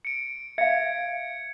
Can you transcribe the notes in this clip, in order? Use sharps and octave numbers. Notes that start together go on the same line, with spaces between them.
C#7 D7
E5 F5 G#6 C#7